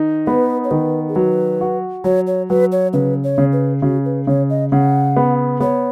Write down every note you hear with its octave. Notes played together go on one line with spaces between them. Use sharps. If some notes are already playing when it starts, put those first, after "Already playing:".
Already playing: D#3 D#4
B3 B4
C#5
D#3 B4
G#4
F#3 B4
F#4
F#3 C#5
C#5
F#3 B4
C#5
C#3 B4
C#5
C#3
B4
C#3 F#4
B4
C#3 C#5
D#5
C#3 F#5
B3
B3 C#5